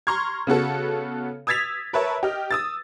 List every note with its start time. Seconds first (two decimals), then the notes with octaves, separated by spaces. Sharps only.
0.07 A#5 C6 C#6 F6 G#6
0.47 C#3 B3 F#4 A4
1.47 D#6 E6 G#6 A6 B6 F7
1.93 A#4 B4 C#5 E5 A5
2.23 G4 D#5 F6
2.51 D#6 E6 A6